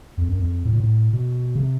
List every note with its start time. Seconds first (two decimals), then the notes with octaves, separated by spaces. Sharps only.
0.18 F2
0.29 F#2
0.39 F2
0.65 A2
0.73 A#2
0.80 A2
1.13 B2
1.55 C#3
1.60 C3